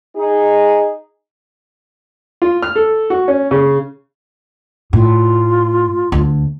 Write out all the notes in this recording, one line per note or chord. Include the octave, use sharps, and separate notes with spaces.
D#4 G#4
F4
F6
A4
F#4
C#4
C#3
A2 F4
D2